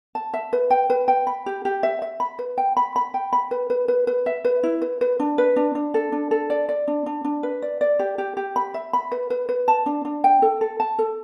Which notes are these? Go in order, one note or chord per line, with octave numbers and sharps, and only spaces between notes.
A5
E5
B4
G5
B4
G5
B5
G4
G4
E5
E5
B5
B4
G5
B5
B5
G5
B5
B4
B4
B4
B4
E5
B4
E4
B4
B4
D4
B4
D4
D4
A4
D4
A4
D5
D5
D4
D4
D4
B4
D5
D5
G4
G4
G4
B5
E5
B5
B4
B4
B4
A5
D4
D4
G5
A4
A4
A5
A4